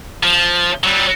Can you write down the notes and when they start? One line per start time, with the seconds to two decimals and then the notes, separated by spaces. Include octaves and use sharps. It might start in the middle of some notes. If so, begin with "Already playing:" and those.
0.23 F3
0.84 F#3 G3